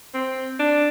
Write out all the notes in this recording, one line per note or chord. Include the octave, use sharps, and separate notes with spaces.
C4
D4